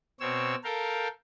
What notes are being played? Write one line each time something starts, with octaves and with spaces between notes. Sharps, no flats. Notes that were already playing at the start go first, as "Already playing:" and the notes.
B2 C4 C#5 E6
A4 A#4 F5 G5